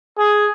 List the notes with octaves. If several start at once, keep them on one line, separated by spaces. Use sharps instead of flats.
G#4